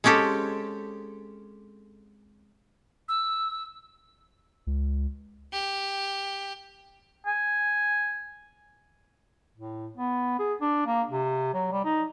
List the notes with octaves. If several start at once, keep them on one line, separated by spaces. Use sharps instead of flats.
G#3 C4 C#4 G4 A4
E6
C#2
G4
G#5
A2
B3
G#4
D4
A#3
C3
F#3
G3
D#4